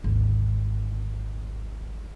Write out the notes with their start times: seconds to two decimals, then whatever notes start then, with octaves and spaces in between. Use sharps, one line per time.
0.04 G#1 D2